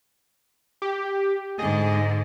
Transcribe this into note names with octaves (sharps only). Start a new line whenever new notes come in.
G4
G#2 D3 G#4 D#5